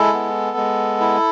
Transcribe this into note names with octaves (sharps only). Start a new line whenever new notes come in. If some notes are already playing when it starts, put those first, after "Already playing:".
Already playing: G#3 E4 A4
B3
G#3
E4